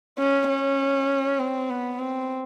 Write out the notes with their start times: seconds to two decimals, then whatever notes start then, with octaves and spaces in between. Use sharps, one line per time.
0.19 C#4
0.49 C#4
1.39 C4
1.70 B3
1.99 C4